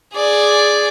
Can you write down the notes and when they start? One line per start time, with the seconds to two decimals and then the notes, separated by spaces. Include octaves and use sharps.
0.15 G#4 D5